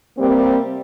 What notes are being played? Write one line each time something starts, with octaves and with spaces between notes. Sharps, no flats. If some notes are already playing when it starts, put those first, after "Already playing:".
C3 G3 A#3 C4